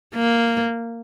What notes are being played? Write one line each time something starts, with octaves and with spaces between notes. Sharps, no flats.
A#3